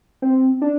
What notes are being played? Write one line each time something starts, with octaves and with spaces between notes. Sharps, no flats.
C4
D4